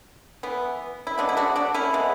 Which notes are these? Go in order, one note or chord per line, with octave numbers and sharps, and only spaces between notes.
E3 B3
E4
C#3 G#3 B3 D4
E4
D4 F#4
D4 F#4
C#4 E4
C#3 G#3 B3